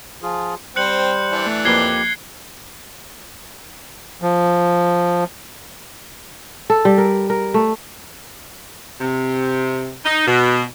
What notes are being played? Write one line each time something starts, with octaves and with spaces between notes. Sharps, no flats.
F3 F4 G#4
G3 C4 C5 F#6 C#7 F#7
E3 D4
A3
F2 F3 A#3 G4 B4 G#6 C7 G7
F3
A4
G3
A#4
A#4
A3
C3
D#4
B2